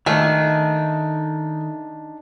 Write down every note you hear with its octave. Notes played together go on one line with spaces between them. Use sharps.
D#3 A3 D4 D#4 G#5